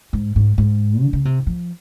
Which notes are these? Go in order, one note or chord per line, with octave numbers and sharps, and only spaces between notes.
G#2
G#2
G#2
D3
C#3
C3
F3